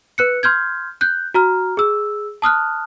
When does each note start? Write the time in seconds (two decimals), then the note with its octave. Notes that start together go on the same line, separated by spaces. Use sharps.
0.18 B4 F#6 C#7
0.43 C6 F6 G6 G#6
1.01 F#6 G6
1.34 F#4 A#5 F6
1.77 G#4 E6
2.42 A5 D#6 F6 F#6